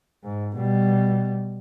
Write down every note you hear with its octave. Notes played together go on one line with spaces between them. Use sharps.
G#2
B2 G3